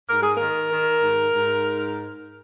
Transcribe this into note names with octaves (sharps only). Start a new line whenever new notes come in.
G#2 A#4
G#4
D#3 A#4
D#3
G#2
G#2